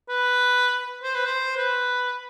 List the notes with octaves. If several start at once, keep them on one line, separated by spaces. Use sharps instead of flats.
B4
C5
B4
C5
B4